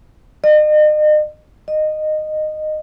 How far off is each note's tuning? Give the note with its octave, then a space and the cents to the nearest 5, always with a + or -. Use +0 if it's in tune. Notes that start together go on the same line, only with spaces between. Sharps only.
D#5 -40
D#5 -15